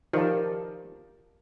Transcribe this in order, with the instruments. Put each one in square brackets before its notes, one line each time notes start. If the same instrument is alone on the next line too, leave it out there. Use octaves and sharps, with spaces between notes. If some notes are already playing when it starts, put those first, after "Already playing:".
[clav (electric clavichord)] D#3 F3 [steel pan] G4 A#4 D5 F5 A5